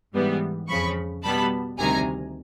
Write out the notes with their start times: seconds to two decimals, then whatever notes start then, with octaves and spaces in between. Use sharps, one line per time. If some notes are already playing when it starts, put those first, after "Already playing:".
0.14 G#2 E3 G3 B3
0.68 F2 C#3 F3 B5 C#6
1.23 B2 G3 B3 A5 B5
1.78 D2 C3 D#3 G3 G#5 A#5